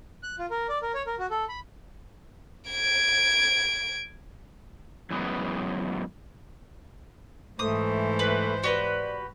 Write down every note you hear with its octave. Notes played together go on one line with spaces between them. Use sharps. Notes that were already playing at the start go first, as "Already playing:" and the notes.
F#6
F4
A#4
D5
A#4
C#5
A#4
F#4
A4
B5
G#6 D7
F#2 E3 G#3 B3
G#2 E3 A3 C5 D#6
B4
F#4 G4 B4 D5